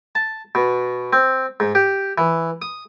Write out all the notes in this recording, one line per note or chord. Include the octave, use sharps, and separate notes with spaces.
A5
B2
C4
G#2
G4
E3
D#6